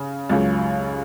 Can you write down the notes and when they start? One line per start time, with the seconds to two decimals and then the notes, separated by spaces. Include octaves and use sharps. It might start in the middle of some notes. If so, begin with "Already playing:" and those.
Already playing: C#3
0.29 C#2 C#3 F#3